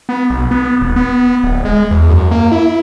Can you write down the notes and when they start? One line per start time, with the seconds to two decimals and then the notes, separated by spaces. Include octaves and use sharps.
0.09 B3
0.30 B1
0.51 B3
0.81 D#1
0.96 B3
1.44 D1
1.65 G#3
1.91 E2
2.09 F#2
2.31 A#3
2.52 E4